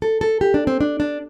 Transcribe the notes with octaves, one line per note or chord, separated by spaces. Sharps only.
A4
A4
G4
D4
C4
D4
D4